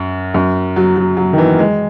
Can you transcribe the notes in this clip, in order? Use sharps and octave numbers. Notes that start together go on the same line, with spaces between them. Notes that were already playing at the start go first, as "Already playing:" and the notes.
Already playing: F#2
F#2
F#3
F#3
F#3
D#3
E3
G#3